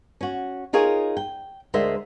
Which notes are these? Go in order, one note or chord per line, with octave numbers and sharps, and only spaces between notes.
C#4 F#4
D#4 F4 G#4 A#4 C#5
G5
D2 G#3 A#4 C5 D5 E5